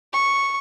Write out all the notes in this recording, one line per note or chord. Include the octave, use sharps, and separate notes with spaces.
C#6